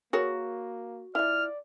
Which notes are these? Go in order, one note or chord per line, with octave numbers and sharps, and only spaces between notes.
A#3 F#4 G#4 A#4 C#5
F3 E4 D5 F6